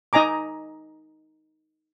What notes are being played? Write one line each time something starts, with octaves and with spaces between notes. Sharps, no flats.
D#4 D#5 G#5 A#5 D6